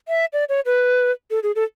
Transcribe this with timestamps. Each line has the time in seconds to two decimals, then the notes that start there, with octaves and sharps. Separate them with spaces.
0.08 E5
0.33 D5
0.49 C#5
0.66 B4
1.31 A4
1.43 G#4
1.55 A4